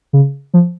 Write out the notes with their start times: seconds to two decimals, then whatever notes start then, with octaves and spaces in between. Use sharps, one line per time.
0.13 C#3
0.54 F3